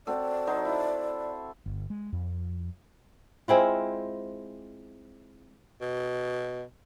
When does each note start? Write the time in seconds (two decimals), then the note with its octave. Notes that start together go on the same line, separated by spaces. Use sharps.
0.07 C4 F#4 A4 D5
0.47 F#3 D#4 C5
0.65 E4 A5
1.66 G1
1.90 G#3
2.12 F2
3.48 G#3 C4 E4 F4
5.81 B2